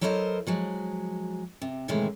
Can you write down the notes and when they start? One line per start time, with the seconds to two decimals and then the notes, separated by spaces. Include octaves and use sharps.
0.01 F#3 E4 A4 A#4 C5 D#5
0.47 F3 F#3 G#3
1.61 C3
1.88 A2 C3 D#3 E3 G#3 A3